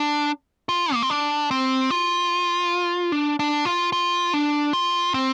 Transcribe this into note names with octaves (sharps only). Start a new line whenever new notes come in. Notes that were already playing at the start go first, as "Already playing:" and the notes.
Already playing: D4
F4
A#3
C4
D4
C4
F4
D4
D4
F4
F4
D4
F4
C4